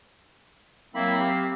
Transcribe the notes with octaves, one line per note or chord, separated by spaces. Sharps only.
F#3 A#3 C4 E4 B5
G4 F5